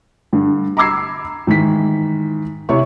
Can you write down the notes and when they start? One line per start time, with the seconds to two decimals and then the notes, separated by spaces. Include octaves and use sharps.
0.33 G2 D3
0.77 A#5 B5 D6 E6 G#6 C7
1.47 G#2 D#3 E3 B6
2.69 C3 E4 C#5 C#6